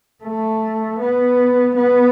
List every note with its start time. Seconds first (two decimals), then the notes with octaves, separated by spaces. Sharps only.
0.24 A3
1.00 B3
1.76 B3